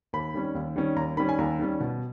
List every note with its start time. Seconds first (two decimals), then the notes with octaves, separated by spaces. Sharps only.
0.13 D#2 B5
0.34 D#3 G3 C#4
0.55 D#2
0.76 D#3 G3 C#4
0.96 D#2 A#5
1.17 D#3 G3 C#4 B5
1.29 G#5
1.39 D#2 A#5
1.59 D#3 G3 C#4
1.80 B2